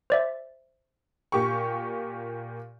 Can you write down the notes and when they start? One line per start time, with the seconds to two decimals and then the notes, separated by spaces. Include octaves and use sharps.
0.10 C5 D5 E5
1.32 A#2 G4 C#6